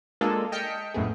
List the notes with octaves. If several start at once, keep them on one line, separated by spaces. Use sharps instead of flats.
G#3 A#3 D4 F4 G#4 A4
D#5 G5 A5 F6 B6 C#7
F#2 A2 A3 B3 G#4